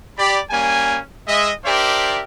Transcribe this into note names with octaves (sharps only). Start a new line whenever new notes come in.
G4 D5 B5
G3 A#3 C#4 G#5
G#3 D#5 E5
D4 G4 A#4 C5 D5 E5